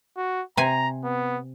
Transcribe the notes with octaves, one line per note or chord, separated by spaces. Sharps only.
F#4
C3 G#5 A#5
B3